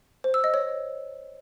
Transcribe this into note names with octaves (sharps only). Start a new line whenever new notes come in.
C5
E6
D#5
C#5